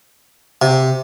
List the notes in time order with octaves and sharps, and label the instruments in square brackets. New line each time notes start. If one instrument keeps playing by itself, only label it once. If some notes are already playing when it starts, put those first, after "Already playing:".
[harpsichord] C3